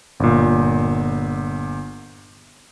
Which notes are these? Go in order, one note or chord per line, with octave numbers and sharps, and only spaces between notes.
G1 A#2